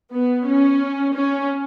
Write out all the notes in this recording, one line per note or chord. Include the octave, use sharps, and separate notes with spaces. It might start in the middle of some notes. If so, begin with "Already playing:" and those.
B3
C#4
C#4